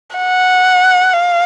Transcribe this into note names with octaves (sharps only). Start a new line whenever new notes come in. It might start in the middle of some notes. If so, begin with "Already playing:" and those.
F#5
F5